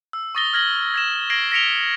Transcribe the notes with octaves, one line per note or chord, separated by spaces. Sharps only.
E6
C#6 D#6 A6 A#6 G7
F6 G#6 A#6 F#7 G7
G#6 A#6 E7
G#6 A#6 C7 D7 F#7 G7
A#6 B6 C#7 D7 F7 G7